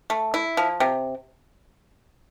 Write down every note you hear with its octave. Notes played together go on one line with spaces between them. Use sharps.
A3
E4
F3
C3